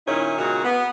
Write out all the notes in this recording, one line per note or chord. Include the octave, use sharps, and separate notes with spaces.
A#2 D#3 C#4 D#4 E4
A#2 C#3 G#3 F#4 A#4
B3